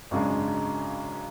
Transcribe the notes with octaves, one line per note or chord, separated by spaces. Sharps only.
G#1 F#2 C#3 G#3 D4